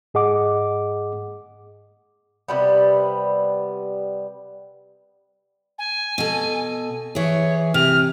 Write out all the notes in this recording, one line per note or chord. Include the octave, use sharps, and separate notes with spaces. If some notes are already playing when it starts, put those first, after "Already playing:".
G#2 G#4 D#5 F#5 D6
C3 G3 B3
G#5
B2 A4
E3 G#4 C#5
C3 F6